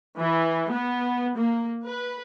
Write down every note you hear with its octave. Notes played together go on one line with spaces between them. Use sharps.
E3
B3
A#3
B4